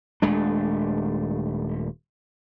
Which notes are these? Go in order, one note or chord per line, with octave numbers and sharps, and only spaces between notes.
D#1 G#3 A3 D4